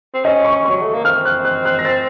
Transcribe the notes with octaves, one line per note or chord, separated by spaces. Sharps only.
C4
C#4 D#5
C#6
F#3 C#6
A3
A#3
C4 F6
F#6
F#6
F#6
A#6
A6